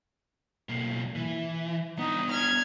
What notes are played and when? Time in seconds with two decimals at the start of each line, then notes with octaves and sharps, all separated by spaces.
0.69 B1 A#3
1.15 E3
1.98 B3 D4 D#4
2.31 F6 G#6